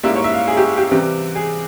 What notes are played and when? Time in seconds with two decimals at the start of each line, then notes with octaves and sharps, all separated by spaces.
0.03 G#2 G3 A#3 E4 E5
0.15 C#5
0.24 E5
0.33 F5
0.48 G#4
0.57 G4
0.77 G4
0.91 C3 E3 G3 C4
1.35 G#4